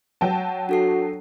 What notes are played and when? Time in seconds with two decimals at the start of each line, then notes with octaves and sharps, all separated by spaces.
0.21 F#3 G5 A5
0.69 D4 F#4 A4 C7